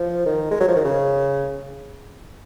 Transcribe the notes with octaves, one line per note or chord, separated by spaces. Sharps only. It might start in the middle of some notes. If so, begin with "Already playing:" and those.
Already playing: F3
D#3
G#3
F#3
F3
D#3
C#3